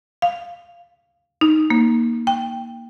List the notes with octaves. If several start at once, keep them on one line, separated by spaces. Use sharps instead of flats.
F5
D#4
A#3
G5